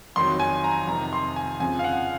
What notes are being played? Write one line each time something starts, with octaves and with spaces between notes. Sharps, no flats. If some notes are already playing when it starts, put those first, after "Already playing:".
F2 D#3 F#3 C6
G#5
A#5
F2 C3 D#3 A#5
C6
G#5
F2 C#3 F3 G#5
F5
F#5